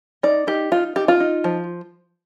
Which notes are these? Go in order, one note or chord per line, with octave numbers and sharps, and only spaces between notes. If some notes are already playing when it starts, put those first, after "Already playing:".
D#4 D5
D#4 G4
D#4 F4
D#4 G4
F4
D#4
F3